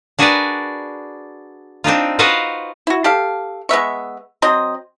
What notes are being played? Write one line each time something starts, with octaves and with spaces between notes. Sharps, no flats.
D4 F#4 G#4 A#4 B4 D5
C4 D4 D#4 F4
F4 F#4 B4 C5 D#5 F5
E4 F#4
G4 A4 F5
G#3 B3 E5 C#6
F#3 C4 C5 D#5